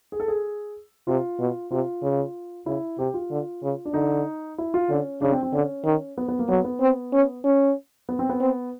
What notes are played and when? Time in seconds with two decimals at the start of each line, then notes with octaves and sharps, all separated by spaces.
0.12 G#4
0.20 A4
0.28 G#4
1.07 C3 F4
1.40 B2
1.72 C3 F4
2.03 C#3
2.66 C#3 E4
2.98 C3 G4
3.14 F4
3.31 D3
3.63 C#3
3.85 D4
3.94 D3 D#4
4.58 E4
4.74 F4
4.90 D3 C#4
5.21 C#3 D4
5.32 C4
5.43 C4
5.53 D3 C#4
5.85 D#3
6.17 B3
6.28 B3
6.39 A#3
6.49 F#3 B3
6.64 B3
6.81 C4
7.13 C#4
7.44 C#4
8.09 B3
8.19 C4
8.29 B3
8.40 C4